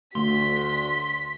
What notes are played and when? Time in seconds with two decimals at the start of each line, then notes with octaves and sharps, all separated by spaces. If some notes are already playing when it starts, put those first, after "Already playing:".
0.15 D2 D3 A3 F#4 C6 B6